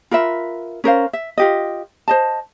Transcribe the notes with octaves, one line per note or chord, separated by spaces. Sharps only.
F4 A#4 B4 E5
C#4 A#4 C5 F5
E5
F4 G4 D#5
C5 D#5 A5